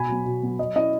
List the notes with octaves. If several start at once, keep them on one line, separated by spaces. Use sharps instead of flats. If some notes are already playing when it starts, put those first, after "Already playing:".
Already playing: B2 G#5 B5
F#3 B3
B2
F#3 B3
F#3 D#5
C#4 E4 D#5